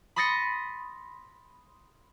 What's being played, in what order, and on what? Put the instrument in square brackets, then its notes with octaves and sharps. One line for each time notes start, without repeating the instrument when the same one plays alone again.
[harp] B5 C6 D#6 A6 A#6 C#7